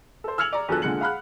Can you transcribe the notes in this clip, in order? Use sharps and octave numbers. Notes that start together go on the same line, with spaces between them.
A4 C5
E6 F6 G#6 C#7 F7 F#7
D5 A#5
E2 G2 F3 F#3 A4 F#6
A#2 D3 G#3 F#6 C#7 F#7
F5 F#5 B5 F6 F#6